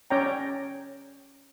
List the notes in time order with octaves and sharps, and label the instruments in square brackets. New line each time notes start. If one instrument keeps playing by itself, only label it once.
[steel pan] C#4 C#5 D5 G5 A#5